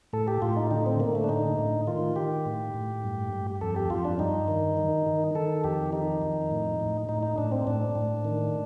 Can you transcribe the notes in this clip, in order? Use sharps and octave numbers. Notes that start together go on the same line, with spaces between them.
A2 A4
G4
A2 F4
D#4
D3 D#4
C4
D3 A#3
A3
D4
A2 D#4
A2
D#3 F4
D#3 G4
A2
A2
G2
G2
F2 A4
G4
F2 F4
D4
G2 D#4
D#3
D#3
D#3
D#3 A4
F2 G4
D#3 D#4
F2
A2
A2
A2 D#4
D#4
A2 D4
C4
A2 D4
A2
D#3